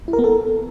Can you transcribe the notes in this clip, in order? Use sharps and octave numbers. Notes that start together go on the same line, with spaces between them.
E4
A#4
B3
A4